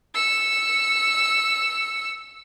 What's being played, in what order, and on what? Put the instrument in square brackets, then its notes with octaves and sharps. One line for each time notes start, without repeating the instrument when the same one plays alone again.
[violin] E6 C#7